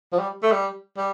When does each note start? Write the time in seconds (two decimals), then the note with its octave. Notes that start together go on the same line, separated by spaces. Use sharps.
0.13 F3
0.19 G3
0.43 A3
0.52 G3
0.98 G3